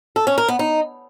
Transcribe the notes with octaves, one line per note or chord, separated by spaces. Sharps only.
A4
C#4
A#4
B3
D#4